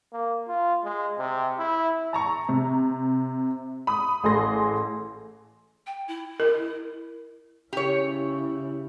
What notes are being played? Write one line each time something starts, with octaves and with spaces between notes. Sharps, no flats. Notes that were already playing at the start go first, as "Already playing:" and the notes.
A#3
F4
G#3
C3
E4
A5 A#5 C#6
C3
B5 D#6
A1 G#4 A4 C6 A#6
G5
E4
A#4
C#3 E4 G4 C#5